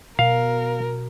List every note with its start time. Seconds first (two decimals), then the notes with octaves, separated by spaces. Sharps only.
0.19 B2 A#4 F5